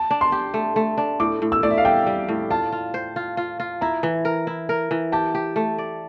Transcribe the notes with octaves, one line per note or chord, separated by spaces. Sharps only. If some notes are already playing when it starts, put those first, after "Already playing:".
Already playing: A5
D4
C6
G4
A3
A3
D4
A2 D6
A2
E6
A2 D5
E5
F5
G3 G5
G3
A2
F4 A5
F4
C5
F4
F4
F4
E4 A#5
E3
A#4
E4
A#4
E3
G4 A5
G4
A3
D5